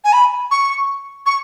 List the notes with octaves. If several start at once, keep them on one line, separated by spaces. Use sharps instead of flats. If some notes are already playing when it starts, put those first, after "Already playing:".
G#5
B5
C#6
C#6